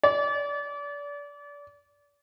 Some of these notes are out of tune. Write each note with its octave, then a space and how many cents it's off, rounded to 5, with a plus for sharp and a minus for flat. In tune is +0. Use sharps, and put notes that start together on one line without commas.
D5 -30